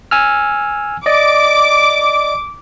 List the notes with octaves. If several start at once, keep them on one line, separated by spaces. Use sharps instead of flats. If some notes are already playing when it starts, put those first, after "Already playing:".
G#5 E6 F6
D5 D#5 D6